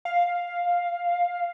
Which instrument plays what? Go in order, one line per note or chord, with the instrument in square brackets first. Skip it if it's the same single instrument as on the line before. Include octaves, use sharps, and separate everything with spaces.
[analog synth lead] F5